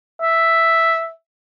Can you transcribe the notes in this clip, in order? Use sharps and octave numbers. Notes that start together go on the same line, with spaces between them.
E5